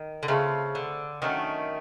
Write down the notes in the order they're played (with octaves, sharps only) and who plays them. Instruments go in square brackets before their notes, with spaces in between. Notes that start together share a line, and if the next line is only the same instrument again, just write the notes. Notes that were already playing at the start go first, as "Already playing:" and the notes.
Already playing: [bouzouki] D#3
D3
[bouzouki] C#3 [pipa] A3 C4 F4 A4
[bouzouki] D3
[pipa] D3 F#3 A3 C#4 [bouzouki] D#3